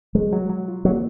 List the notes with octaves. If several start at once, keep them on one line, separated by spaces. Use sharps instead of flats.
F#3 G#3
F#3
F#3
F4
F#3 A#3